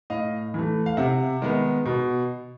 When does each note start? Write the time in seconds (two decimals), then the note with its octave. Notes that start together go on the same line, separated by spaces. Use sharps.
0.10 A2 D#5 F5
0.54 E3 A3
0.86 F5
0.97 C3 E5 F#5
1.42 D#3 G#3 B3
1.85 B2